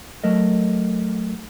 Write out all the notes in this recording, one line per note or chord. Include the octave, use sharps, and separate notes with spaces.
F#3 A3 A#4 D#5